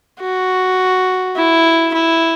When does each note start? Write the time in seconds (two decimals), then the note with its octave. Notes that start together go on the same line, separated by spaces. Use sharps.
0.21 F#4
1.36 E4
1.94 E4